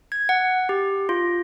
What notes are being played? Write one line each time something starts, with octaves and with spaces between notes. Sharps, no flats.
G#6
F#5
G4
F4